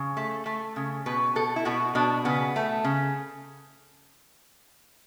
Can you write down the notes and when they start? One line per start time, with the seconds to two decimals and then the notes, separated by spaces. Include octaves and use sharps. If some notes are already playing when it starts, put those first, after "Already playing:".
Already playing: C#3
0.17 A3
0.46 A3
0.76 C#3
1.06 B2 B4
1.36 B2 A4
1.56 E4
1.65 B2 F#4
1.95 B2 D4
2.25 C#3 B3
2.56 A3
2.84 C#3